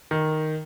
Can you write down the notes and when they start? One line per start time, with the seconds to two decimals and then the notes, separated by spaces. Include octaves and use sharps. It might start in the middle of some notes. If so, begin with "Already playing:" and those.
0.11 D#3